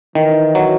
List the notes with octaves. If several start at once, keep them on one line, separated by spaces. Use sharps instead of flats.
D#3 E3
F#3